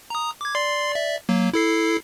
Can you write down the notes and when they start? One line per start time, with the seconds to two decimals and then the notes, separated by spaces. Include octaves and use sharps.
0.10 A#5 D#6
0.41 D6 G#6
0.55 D5 C6 C7
0.92 D5 E5
1.29 F#3 A#3
1.54 E4 A4 C7